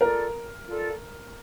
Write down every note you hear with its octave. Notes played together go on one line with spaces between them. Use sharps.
F4 A4 A#4 D5
F4 A4 D5